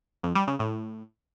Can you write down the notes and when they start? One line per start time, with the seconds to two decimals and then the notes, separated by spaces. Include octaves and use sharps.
0.23 F2
0.35 G3
0.47 C#3
0.59 A2